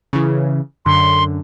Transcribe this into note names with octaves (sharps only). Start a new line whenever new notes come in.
C#3 E3
F#2 D3 C6